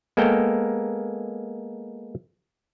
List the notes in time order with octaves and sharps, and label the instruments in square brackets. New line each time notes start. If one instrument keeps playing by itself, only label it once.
[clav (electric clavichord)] G#3 A#3 B3 A4 A#4 G5